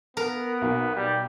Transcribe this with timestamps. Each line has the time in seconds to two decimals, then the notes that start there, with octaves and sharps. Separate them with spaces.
0.17 B3 A#4
0.62 B1
0.96 G3